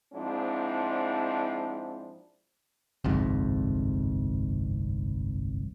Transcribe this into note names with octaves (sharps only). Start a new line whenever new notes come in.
G#2 F3 C4 D4 E4
G1 C2 F2 G#2